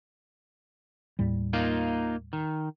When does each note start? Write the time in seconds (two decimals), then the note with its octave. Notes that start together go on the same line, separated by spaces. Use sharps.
1.19 D#2 A2 G3
1.53 A#3 D#4 F4
2.33 D#3